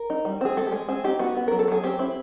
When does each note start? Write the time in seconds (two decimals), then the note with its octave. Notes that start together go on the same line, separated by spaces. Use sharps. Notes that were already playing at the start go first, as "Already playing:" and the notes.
Already playing: A#4
0.10 D#4
0.25 G3
0.41 C4 G#4
0.57 G#3 A4
0.67 G4
0.72 G#3 G#4
0.89 C4 G#4
1.04 D#4 G4
1.19 B3 F#4
1.37 B3
1.48 F#3 A#4
1.59 A4
1.68 F#3 G#4
1.84 C4 G4
1.99 C4 E4